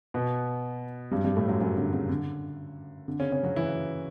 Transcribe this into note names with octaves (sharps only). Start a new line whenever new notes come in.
B2 B3
G2 G3
G2 G3
A2 A3
F#2 F#3
F#2 F#3
D3
C#3
D3
D3
C#3 C#4
C#3 C#4
F#3 F#4
E3 E4